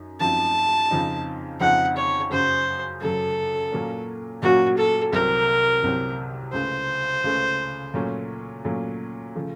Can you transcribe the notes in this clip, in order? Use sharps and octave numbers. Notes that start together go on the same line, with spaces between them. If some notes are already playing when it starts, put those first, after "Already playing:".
Already playing: F#2 D#4
F#2 F3 C4 D#4 A5
F2 C#3 F3 C4 D#4
F2 C#3 F3 C4 D#4 F#5
C#5
F#2 C#3 F#3 C5
F#2 C#3 F#3 A4
A#2 F#3 A#3 C#4
A#2 F#3 A#3 C#4 F#4
A4
C2 C3 F#3 C4 A#4
C2 C3 F#3 C4
C#2 C#3 A3 C5
C#2 C#3 A3
A#2 F#3 A3 C#4
A#2 F#3 A3 C#4
C#3 F3 A3